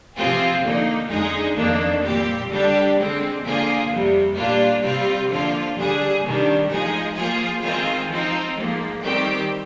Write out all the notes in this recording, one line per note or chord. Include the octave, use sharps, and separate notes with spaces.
C3 F3 C4 F4 G#4
D3 F3 A#3 D#4
F2 D3 G#3 D#4 G#4
F2 D#3 A#3 D4
A#2 G3 C4 G4
D3 G3 D4 G4
D3 G#3 C4
D3 F3 A#3 F4 G#4
F2 C3 G3
A#2 G3 A#3 D4 F4
C3 G3 C4 F4
D3 F3 A#3 F4
D3 G3 D4 G#4
C3 D#3 G3 D4
F3 G#3 D#4 G#4
F3 A#3 F4 G#4
D#3 G#3 C4 F4 G#4
F3 C4 D#4
G#2 F3 A#3
D#3 G3 C4 G4